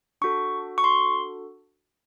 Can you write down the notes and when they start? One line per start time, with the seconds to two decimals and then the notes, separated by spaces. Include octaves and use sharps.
0.21 D4 F#4 A4 C#6
0.78 C#6
0.84 C6